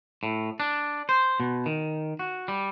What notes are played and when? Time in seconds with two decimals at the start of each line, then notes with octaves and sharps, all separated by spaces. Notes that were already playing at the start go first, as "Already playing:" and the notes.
0.23 A2
0.60 D4
1.09 C5
1.40 B2
1.66 D#3
2.19 F#4
2.48 G3